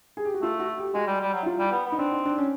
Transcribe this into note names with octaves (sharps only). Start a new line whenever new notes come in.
G#4
G4
F#4
A3 F4
F#4
G4
G#3 F#4
G3
G3
F#3
E4
F4
G3
B3
B3
D#4
C4 D4
D#4
D4
C#4